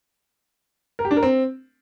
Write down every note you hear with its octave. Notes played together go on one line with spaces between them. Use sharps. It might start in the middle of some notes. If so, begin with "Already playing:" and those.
A#4
G4
D4
A#4
C4